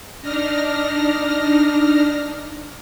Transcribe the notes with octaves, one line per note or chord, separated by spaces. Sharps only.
D4 D#4 F6 A#6